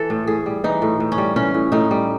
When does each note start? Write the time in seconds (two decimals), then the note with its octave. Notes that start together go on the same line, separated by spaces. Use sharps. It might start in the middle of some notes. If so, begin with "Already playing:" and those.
Already playing: E3 A4
0.10 A2
0.27 A2 G#4
0.46 G3
0.64 E3 D#4
0.82 A2
1.00 A2
1.12 C#4
1.18 G3
1.36 E3 C#4
1.54 A2
1.72 A2 D#4
1.91 G3